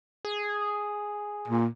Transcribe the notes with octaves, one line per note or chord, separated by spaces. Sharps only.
G#4
A#2